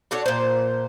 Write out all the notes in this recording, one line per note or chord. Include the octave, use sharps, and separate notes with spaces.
D4 F#4 A4 C#5
A#2 C5